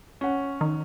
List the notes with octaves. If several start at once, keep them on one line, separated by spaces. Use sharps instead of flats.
C#4 F#5
D#3